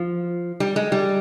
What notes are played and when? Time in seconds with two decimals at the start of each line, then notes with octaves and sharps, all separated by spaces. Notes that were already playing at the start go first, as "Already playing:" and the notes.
Already playing: F3
0.60 G3
0.76 G#3
0.92 G3